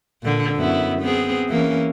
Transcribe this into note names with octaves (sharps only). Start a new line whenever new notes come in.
A#2 D3
F#2 B3 E4
B3 C4 G#4
E3 A#3 C#4